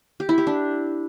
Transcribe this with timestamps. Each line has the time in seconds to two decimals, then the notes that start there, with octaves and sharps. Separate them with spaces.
0.20 G4
0.29 E4
0.38 G4
0.47 D4